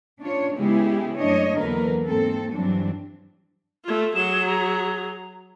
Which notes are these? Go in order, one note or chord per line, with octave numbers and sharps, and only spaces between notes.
C#4 D4 F4 C#5
C#3 G#3 B3 E4 G4 G#4
F#2 A3 D4 C#5 D#5
E2 D3 F#3 A#3 A#4 B4
G#2 A#3 C4 A4
G2 E3 F#3 C4 D4
A3 F4
F#3 G#4 E7
A#5